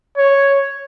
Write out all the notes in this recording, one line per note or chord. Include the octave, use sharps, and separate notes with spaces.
C#5